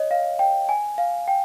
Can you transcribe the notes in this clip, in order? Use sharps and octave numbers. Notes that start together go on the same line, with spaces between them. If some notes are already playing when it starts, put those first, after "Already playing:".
Already playing: C#5 D#5
F5
G5
G#5
F5
G5